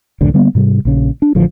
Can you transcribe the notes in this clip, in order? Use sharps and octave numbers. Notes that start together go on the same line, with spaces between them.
C2 F2 A2 D3
D3 G3 A#3 B3
G#2 C3 G3
A#1 C#3
D4
A1 D3 F3